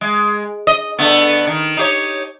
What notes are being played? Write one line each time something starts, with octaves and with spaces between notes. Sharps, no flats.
G#3
D#5
D3 A3 B3
D#3
D#4 G4 C#5